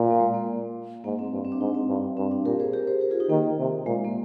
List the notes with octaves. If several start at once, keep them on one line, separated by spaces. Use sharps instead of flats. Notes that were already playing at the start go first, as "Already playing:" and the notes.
Already playing: A#2
A#3
G#3
A#3
G#2 A#3
C4
G2
C4
D4
G#2 D#4
C4
G2
G2 C4
D4
A#2 G4 A#4
G#4 C5
G4 A#4
G#4 C5
G4 A#4
F4 G#4
D#4 G4
D#3 A#3
C3
A#2 G#3
A#3